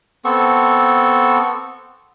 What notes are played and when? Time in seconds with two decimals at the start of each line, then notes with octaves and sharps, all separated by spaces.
0.25 B3 C4 A4 C#6